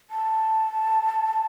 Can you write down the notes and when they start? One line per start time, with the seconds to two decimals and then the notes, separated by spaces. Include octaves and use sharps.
0.11 A5